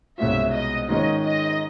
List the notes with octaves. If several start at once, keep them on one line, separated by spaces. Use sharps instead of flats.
C2 B2 G#3 C#4 F4 E5
D#5
G#2 D#3 G#3 C#4 F4 D#5
D#5